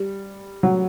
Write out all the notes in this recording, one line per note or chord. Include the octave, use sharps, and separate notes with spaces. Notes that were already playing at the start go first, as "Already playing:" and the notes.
Already playing: G3
F#3